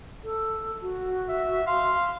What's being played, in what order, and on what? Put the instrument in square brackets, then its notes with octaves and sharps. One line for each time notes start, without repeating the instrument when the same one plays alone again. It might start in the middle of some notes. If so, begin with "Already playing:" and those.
[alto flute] A4
F#4
[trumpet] E5
[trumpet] F5 [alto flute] C6